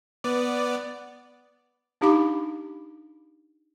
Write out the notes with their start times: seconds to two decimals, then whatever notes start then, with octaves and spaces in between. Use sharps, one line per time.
0.24 B3 D5
2.01 D4 D#4 G4 F5 B5 D6